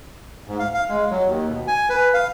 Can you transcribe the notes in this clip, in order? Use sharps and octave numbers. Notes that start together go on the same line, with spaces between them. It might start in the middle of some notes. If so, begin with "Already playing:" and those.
G#2
F5
F5
G#3
F#3
D#2
B2
G#5
B4
F5